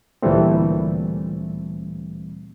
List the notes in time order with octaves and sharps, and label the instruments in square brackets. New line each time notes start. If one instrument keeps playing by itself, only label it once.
[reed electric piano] D2 A#2 E3 G3 A3 C4